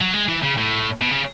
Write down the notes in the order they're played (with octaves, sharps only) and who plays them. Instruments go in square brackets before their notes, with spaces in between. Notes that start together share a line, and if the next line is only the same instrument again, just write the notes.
[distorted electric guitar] F#3
G#3
E3
C#3
A2
B2
C#3